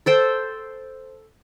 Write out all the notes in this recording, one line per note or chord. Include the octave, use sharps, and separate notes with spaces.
A4 C5 G5